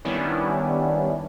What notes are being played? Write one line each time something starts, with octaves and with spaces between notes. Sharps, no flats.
D#3 G3 B3 C#4 D4 E4